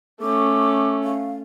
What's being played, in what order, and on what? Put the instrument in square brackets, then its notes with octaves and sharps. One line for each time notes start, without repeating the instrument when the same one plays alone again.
[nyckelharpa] A3 C#4 [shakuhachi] D6
[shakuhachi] F5